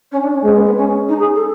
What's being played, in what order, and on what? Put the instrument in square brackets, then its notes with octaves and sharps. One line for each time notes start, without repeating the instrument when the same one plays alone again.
[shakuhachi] C#4
D4
C#4
[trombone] G#3 [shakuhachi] C4
[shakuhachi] B3
B3
C#4
D#4
G#4
A4